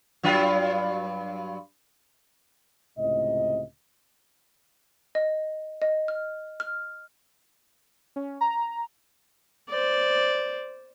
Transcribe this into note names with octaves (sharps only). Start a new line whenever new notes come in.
G2 F#3 F4
C#2 A2 C3 D#5
D#5
D#5
F6
F6
C#4
A#5
C5 D5